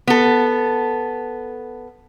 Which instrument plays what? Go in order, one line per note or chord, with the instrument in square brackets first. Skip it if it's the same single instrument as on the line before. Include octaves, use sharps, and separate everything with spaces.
[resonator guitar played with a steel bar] B3 A4